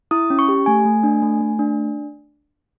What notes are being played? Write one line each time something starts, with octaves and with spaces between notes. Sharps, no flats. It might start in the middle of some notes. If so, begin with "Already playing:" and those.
E4 D#6
C#4
C#6
G4
A3 G#5
A3
D4
A3
A3
D4